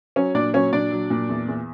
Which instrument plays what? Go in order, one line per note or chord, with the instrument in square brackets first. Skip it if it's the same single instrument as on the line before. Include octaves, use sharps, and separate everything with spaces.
[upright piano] F#3 C#4 C#5
A#2 D4 D5
F#3 C#4 C#5
A#2 D4 D5
F#3
A#2
E2
E2